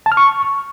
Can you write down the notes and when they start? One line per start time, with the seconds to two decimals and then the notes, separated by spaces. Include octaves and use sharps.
0.06 A5
0.12 F6
0.17 C#6